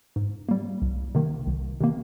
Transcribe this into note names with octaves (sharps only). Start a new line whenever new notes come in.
G#2
G3 A#3
C2
C3 D#3 A#3
C2
C3 D#3 A#3